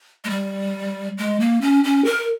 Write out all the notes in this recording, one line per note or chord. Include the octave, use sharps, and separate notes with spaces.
G#3
G3
G#3
A#3
C#4
C#4
A#4